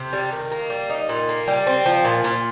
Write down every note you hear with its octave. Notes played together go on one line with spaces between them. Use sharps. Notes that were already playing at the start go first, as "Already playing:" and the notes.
Already playing: C3
G3
D#3
A#3
G3
D#4
A#2
A#3
G3
C4
F3
A#2
A#2